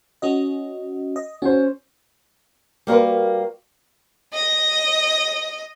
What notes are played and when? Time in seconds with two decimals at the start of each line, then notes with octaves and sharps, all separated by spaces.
0.22 C#4 F#4 D#5
1.16 D#5
1.42 C#4 F#4 C5
2.87 G3 A#3 F#4 A#4 B4
4.33 D#5